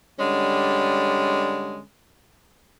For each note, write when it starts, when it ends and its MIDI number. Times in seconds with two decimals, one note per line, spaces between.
0.19 1.81 50
0.19 1.81 55
0.19 1.81 56
0.19 1.81 61